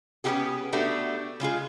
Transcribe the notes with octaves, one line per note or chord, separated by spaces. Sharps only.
B3 C#4 D#4 F4 G4 G#4
A3 B3 D4 F#4 G4
C#3 G#3 F4 G#4